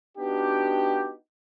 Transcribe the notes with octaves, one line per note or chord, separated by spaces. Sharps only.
B3 D4 D#4 F#4 G4